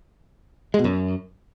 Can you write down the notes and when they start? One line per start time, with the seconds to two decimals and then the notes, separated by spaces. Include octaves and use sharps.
0.74 G#3
0.79 B2
0.84 F#2